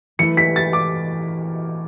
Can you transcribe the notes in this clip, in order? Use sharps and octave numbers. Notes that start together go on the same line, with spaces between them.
E3 A3 E4 C#7
B6
A6
D6